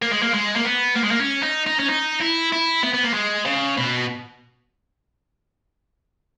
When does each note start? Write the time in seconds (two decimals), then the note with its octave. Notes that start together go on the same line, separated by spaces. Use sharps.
0.02 A#3
0.12 G#3
0.22 A#3
0.34 G#3
0.56 A#3
0.65 B3
0.96 A#3
1.04 G#3
1.11 A#3
1.20 C#4
1.43 D#4
1.66 D#4
1.79 C#4
1.89 D#4
2.20 E4
2.52 E4
2.83 B3
2.94 B3
3.04 A#3
3.14 G#3
3.45 C#3
3.77 B2